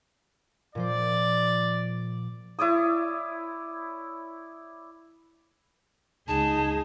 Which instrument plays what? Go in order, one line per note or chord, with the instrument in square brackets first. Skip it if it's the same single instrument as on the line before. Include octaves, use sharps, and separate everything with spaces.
[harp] A#2 F3 C5 [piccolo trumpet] D5
[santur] E4 C#5 D5 D#6
[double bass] C#2 [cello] D#4 G#4 [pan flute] A5